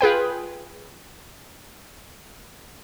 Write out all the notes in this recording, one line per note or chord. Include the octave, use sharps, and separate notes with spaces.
F4 G#4 B4 G5